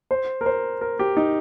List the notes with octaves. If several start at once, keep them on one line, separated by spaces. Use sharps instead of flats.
C5
A#4
C5
A#4
G4
D#4